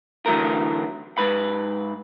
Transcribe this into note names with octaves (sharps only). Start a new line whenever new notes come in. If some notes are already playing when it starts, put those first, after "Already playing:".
D3 E3 F#3 A3 A#4
G#2 B4 B5